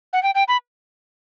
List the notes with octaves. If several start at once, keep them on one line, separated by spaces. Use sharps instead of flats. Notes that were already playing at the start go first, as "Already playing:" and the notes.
F#5
G5
G5
B5